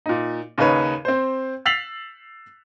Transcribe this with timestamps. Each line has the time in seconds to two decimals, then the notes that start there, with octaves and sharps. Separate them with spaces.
0.06 A#2 D#4
0.58 D#2 C#3 D#4 B4 C#5
1.05 C4 C5
1.66 E6 A6 B6 C7 F7 F#7